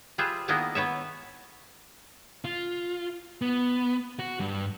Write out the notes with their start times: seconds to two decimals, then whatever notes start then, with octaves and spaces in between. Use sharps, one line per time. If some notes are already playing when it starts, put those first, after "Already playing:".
0.18 G3 F4 G#4 B4 C5 E5
0.48 D#3 A#3 B3 E4 G#4 D#5
0.75 B3 B4 C#5 E5
2.45 F4
3.42 B3
4.19 F#4
4.40 G2